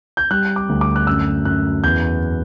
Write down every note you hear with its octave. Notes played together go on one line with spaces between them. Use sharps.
G6
G3 F#6
D6
D2
D6
F#6
F#2 E6
F#2 F#6
E2 G6